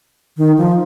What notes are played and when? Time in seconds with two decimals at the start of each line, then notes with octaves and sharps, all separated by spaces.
0.37 D#3
0.58 F3